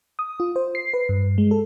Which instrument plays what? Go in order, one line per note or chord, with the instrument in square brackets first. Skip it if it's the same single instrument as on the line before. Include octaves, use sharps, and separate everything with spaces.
[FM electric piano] D#6
F4
C5
C7
B4
G2
G#3
A4